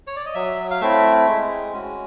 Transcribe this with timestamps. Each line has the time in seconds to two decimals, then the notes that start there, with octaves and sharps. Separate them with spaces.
0.07 C#5
0.16 D5
0.26 D#5
0.34 F#3 E5
0.71 F5
0.81 A3 C4 E4 E5
1.27 G#3
1.73 C#4 F#4